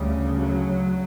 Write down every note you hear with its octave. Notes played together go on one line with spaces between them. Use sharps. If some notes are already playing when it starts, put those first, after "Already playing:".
Already playing: D2 C#3 G3
F#3